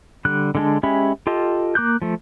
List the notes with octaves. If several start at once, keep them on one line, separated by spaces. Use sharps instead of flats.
D3 G3 F#6
D3 G#3 D4
G#3 C#4 G4 E5 B5
F4 G4 A4 D#5
A#3 D6 F#6 G6
F3 A3